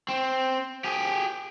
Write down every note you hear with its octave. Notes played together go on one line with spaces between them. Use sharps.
C4
G4 G#4